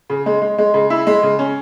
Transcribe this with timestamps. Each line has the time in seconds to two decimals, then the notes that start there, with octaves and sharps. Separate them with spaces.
0.10 C#3
0.26 G#3
0.42 G#3
0.58 G#3
0.74 C#3
0.90 E4
1.07 G#3
1.23 C#3
1.39 C#4